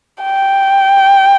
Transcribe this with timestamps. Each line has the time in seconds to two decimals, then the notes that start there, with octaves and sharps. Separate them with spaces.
0.23 G5